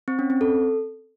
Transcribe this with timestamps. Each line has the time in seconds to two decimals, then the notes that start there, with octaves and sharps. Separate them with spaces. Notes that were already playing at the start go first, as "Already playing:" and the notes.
0.08 C4
0.19 C#4
0.30 C4
0.41 A4